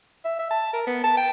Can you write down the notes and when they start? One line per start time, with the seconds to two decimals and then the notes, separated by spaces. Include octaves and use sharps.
0.25 E5
0.39 E5
0.50 A5
0.73 A#4
0.87 B3
1.03 A5
1.17 G5